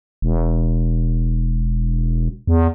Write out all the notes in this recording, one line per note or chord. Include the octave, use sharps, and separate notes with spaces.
E1
E2